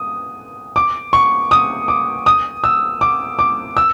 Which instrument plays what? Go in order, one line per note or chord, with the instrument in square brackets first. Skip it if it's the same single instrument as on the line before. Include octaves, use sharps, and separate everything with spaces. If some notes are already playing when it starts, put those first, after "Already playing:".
Already playing: [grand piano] D#6
D6
C#6
D#6
D6
D#6
E6
D6
D6
E6